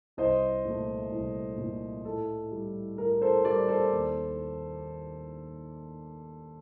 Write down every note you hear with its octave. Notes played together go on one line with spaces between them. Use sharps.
C2 C5 D#5
A#2 A3
C2
A#2 A3
A2 A4
G3
A2 A#4
A4 C5
G3 A#4 D5
A4 C5
D#2